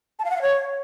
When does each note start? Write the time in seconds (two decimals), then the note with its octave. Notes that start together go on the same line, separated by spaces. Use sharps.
0.19 A5
0.25 F5
0.30 F#5
0.36 F5
0.42 C#5